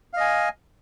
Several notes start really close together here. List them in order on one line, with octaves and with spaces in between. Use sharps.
F5 D#5 G#5